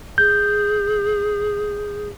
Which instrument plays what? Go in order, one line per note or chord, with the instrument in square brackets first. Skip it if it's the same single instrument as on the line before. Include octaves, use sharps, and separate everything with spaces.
[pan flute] G#4 [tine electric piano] G6